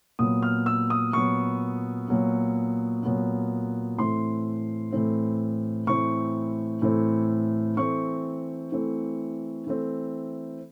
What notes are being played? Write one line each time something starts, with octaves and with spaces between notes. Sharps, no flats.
A#2 F#3 B3 D#6
F6
E6
D#6
A#2 F#3 B3 C#6
A#2 F#3 B3
A#2 F#3 B3
A2 E3 A3 C4 C6
A2 E3 A3 C4
A2 E3 A3 C4 C#6
A2 E3 A3 C4
E3 A3 C4 C#6
E3 A3 C4
E3 A3 C4